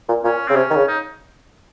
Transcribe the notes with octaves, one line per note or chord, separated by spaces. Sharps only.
A#2
A#2 C#4
C#3 C4
C3 C#4
D#3
C#3
D#4